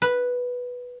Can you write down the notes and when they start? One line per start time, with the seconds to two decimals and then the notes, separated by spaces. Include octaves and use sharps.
0.02 B4